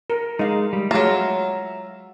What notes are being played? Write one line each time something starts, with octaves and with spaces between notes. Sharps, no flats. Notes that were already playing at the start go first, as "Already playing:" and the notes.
A#4
G#3 D#4 F5
G3
F#3 G#3 A3 F4 E5 A#5